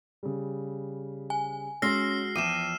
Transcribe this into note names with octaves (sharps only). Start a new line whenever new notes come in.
C#3 G3
G#5
G#3 C#4 F#4 C6 E6 F6 A#6 C7
E2 F3 G5 D6 D#6 D#7 E7